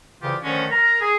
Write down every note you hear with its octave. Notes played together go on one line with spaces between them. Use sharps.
C2 C#3 E3 F4 G4
D3 D#3 F3 G#3 A3 C#4
A#4 A#5
G#4